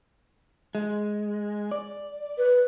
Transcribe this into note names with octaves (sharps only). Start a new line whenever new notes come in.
G#3
D5
B4